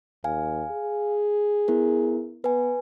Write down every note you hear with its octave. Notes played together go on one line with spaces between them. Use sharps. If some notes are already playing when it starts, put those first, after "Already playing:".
D#2 F5 G#5
G#4
B3 E4 A#4
B3 B4 G#5